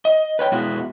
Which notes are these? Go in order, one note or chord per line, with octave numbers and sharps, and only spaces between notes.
D#5
B4 C#5 G5
F2 B2 G#3 B3 E4 F#4